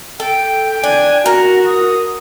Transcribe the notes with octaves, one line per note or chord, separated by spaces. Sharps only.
A4 G5
D4 G#5
F#4 A#4
D#6